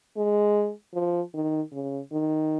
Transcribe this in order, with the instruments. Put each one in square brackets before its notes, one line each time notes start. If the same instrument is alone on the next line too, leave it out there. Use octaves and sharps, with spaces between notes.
[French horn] G#3
F3
D#3
C#3
D#3